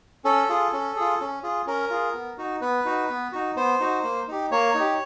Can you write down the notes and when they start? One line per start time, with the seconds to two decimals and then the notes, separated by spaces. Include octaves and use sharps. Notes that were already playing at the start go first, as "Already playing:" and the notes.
0.25 C#4 A4
0.49 F4 G#4
0.73 C#4
0.96 F4 G#4
1.20 C#4
1.43 F4 G#4
1.66 C#4 A#4
1.90 F4 G#4
2.14 B3
2.38 D#4 F#4
2.61 B3 B4
2.85 D#4 F#4
3.09 B3
3.32 D#4 F#4
3.56 B3 C5
3.80 D#4 F#4
4.04 A#3
4.28 D#4 G4
4.51 A#3 C#5
4.75 D#4
4.80 G4